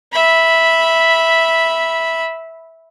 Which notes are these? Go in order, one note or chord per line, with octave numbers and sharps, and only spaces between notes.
E5 B5